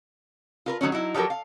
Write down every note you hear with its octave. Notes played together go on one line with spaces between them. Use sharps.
F4 A#4 B4
D#3 F#3 A3 C#4
F#3 D#4 E4
F3 F#3 G4 A4 A#4
F5